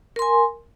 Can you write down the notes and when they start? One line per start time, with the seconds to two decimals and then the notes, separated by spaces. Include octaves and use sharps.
0.16 A#4
0.19 C6
0.22 G#5